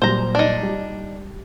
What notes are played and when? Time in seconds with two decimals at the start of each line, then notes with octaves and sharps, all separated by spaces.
0.02 A#2 F#3 G3 C5 A#5
0.35 D4 D#4
0.63 G3